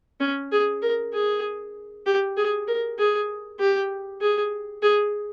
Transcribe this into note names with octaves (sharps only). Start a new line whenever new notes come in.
C#4
G#4
A#4
G#4
G4
G#4
A#4
G#4
G4
G#4
G#4